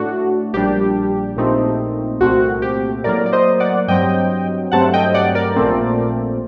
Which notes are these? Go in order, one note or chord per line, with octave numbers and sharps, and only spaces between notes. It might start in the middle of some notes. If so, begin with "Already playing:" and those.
Already playing: A2 A3 D4 F#4
A#1 A#2 G3 D4 G4
A#1 A#2 A3 C4 D#4
C2 A#2 A3 C4 F#4
G4
A2 F#3 A#3 A#4 D5
D5
C5 D#5
D5 F#5
G2 F#3 C4 D#5 G5
G2 F#3 A3 C4 F#5 A5
D#5 G5
D5 F#5
A#4 D5
A#1 A#2 A3 C4